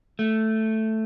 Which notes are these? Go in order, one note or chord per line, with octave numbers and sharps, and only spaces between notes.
A3